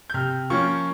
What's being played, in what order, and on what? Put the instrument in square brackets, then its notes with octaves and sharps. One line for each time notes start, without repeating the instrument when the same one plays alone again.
[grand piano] G6
C3 F6
F3 A#3 C#4 C#6